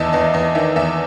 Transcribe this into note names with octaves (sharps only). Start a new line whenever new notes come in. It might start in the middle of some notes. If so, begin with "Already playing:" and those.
Already playing: E2 D#3 D#5 E5 A5
E2 D#5
E2 D#5
D#3 E5
E2 E5